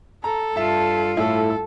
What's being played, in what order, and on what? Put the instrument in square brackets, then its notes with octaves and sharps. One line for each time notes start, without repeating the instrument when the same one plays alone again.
[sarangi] A4 [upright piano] A#5
[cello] G2 F4 [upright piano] E5 A5
[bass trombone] A2 [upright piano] E4 [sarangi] A4